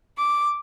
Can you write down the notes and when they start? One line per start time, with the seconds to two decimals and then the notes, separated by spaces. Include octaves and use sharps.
0.19 D6